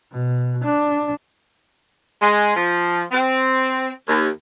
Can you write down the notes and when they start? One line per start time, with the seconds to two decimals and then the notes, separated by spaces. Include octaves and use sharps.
0.12 B2
0.64 D4
2.21 G#3
2.56 F3
3.12 C4
4.08 D#2